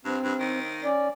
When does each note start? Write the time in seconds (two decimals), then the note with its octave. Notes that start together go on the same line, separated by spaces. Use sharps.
0.05 G2 C4
0.24 G2
0.40 D#3
0.84 C#4 D5